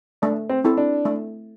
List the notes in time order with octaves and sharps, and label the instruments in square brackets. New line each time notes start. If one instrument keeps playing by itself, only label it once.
[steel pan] A3 [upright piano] D4
[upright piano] C4
[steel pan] C4 E4 A4
[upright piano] D4
[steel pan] A3